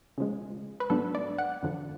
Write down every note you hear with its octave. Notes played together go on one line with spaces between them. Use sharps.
C#3 F3 G#3
B4
G#2 F#3 B3 D4 A4
D5
F#5
F2 D3 F3